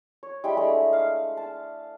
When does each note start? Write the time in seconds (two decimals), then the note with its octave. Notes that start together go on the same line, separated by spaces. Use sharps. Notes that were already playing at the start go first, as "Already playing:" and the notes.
0.23 C#5
0.44 G3 G#3 E4 G5
0.57 G#3 A3 D4
0.93 F5
1.37 A5